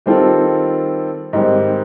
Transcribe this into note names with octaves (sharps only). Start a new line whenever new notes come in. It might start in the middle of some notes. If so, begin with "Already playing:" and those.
D#3 G3 C4 F4 A4
G#2 D#3 G3 C4